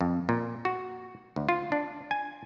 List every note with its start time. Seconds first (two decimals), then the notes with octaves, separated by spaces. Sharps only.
0.01 F2
0.29 A#2
0.65 F#4
1.36 D2
1.49 F4
1.72 D4
2.11 G#5